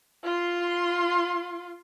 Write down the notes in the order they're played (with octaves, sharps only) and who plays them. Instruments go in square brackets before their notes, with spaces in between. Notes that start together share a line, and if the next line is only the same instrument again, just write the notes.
[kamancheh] F4 C6